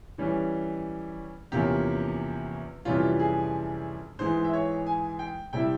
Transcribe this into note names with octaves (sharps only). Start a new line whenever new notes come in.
E3 G3 C#4
E2 C3 F3 A#3 C#4 G4
F2 C3 E3 G3 C#4 F4
G#4
G#2 E3 G#3 C5
E5
C#5
G#5
G5
C3 G3 C4 E4 G5